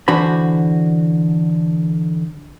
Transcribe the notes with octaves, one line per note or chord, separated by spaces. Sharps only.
D3 E3 D4 F#4 C5 B5